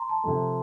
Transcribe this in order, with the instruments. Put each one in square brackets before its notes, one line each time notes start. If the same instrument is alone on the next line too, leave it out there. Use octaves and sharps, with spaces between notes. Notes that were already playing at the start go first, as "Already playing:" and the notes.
Already playing: [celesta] A#5 C6
A5
[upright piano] C3 F3 A3